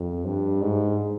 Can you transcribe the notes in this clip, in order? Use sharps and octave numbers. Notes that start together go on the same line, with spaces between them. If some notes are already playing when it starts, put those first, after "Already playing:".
Already playing: F2
G2
G#2